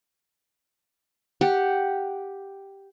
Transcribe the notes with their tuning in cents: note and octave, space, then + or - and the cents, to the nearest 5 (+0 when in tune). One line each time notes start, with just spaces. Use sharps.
G4 +0 F#5 +0